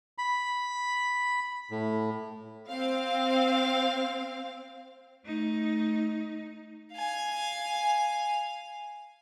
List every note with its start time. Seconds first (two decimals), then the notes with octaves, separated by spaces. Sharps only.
0.18 B5
1.71 A2
2.67 C4 F5
5.24 A3 D#4
6.94 F5 G#5